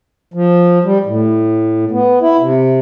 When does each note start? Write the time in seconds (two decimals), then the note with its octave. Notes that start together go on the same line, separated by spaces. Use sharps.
0.34 F3
0.84 G3
1.05 A2
1.91 B3
2.21 E4
2.40 C3